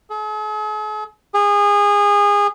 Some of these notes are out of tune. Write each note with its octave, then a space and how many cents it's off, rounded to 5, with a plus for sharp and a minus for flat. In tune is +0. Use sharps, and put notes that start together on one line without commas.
G#4 +45
G#4 -25